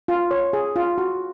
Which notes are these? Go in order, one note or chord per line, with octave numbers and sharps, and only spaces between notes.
F4
C#5
G#4
F4
F#4